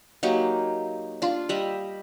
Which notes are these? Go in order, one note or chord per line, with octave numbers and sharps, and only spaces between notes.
F#3 A#3 D#4 G4
D4 F4
G3 D#5 E5